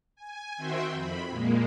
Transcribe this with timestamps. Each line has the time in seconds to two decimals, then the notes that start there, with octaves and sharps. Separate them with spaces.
0.16 G#5
0.57 D#3 C4 F#4 E5 G5 C6
0.92 F2 B5
1.29 A#2 G#3 A#3